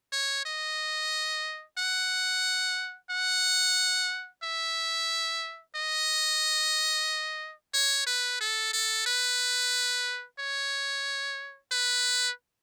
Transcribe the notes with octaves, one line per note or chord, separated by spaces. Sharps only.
C#5
D#5
F#5
F#5
E5
D#5
C#5
B4
A4
A4
B4
C#5
B4